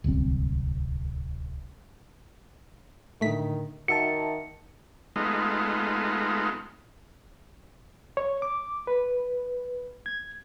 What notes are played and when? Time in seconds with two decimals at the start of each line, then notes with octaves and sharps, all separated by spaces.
0.04 D1 G1 C2 C4
3.21 A2 D3 D#3 A3 B6
3.88 D#3 F#4 E5 A5 C#7
5.16 G#3 A3 B3 D#4 F4
8.17 C#5
8.42 D6
8.87 B4
10.06 G#6